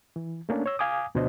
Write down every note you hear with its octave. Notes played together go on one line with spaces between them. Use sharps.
E3
A3 A#3 C#4 D4
C#5 E6
F5 G#5 D6 D#6
D2 B2 F3 D4 C5 D#5